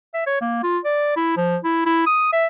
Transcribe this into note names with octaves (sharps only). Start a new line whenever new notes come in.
E5
C#5
A#3
F4
D5
E4
F3
E4
E4
D#6
E5